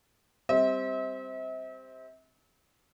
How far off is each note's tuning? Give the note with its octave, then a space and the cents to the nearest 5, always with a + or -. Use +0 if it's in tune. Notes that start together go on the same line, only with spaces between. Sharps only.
G3 +10 C4 +0 E5 -40